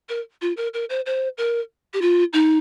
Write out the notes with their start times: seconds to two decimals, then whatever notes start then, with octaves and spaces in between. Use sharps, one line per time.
0.09 A#4
0.41 F4
0.57 A#4
0.74 A#4
0.90 C5
1.06 C5
1.38 A#4
1.93 G4
2.01 F4
2.33 D#4